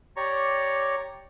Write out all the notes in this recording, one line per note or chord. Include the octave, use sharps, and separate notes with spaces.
G4 C#5 D5 A#5 C#6